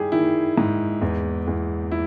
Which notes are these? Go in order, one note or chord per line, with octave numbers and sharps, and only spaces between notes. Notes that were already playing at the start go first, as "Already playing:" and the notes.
Already playing: D#3 G3 E4 G4 G#4
D#3 E4
G#2
E2
E2
E4